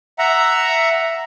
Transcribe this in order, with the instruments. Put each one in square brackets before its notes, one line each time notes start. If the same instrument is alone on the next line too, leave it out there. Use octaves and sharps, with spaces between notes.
[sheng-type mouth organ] E5 F#5 A#5